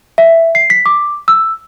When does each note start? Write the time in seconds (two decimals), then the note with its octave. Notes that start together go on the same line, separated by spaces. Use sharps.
0.18 E5
0.55 C7
0.70 B6
0.86 D6
1.28 E6